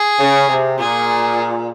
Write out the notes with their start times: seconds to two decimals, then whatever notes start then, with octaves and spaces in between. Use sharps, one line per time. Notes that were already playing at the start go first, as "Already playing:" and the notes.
Already playing: G#4
0.20 C#3
0.49 C3
0.78 A#2 G#4